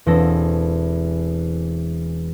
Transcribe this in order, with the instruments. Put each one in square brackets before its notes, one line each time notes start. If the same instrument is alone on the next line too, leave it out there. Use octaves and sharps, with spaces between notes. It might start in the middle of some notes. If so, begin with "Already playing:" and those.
[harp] E1 E2 C4 A4 A#6